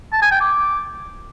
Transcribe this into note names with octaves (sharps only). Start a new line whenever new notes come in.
A5
G#5
G5
D6